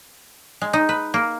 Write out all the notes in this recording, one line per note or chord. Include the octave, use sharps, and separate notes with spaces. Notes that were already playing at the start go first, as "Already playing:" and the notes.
G#3
D#4
B4
A#3